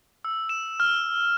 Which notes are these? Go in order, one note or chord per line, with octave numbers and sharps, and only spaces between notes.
E6
E7
F6